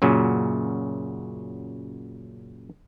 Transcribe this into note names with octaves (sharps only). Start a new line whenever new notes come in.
F#2 A#2 C#3 F#3